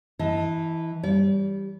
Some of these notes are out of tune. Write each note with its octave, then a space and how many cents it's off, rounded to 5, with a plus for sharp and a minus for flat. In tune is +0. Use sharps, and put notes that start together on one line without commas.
E3 -10 D#5 +30 A5 +0
G3 +0 D5 -40